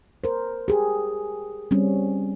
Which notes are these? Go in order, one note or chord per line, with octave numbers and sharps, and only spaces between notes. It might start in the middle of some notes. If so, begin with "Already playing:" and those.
A#4 C5
G4 G#4
G3 C4 C#4